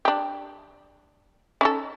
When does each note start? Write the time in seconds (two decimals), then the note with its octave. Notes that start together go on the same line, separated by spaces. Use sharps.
0.05 D4 G4
1.61 C#4 D#4 A4